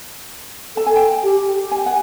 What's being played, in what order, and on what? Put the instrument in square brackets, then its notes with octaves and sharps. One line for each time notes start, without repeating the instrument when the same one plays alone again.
[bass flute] A4 [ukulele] A5
[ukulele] G#5
G5 A5
[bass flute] G4
[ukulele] G#5
G5
F#5 G#5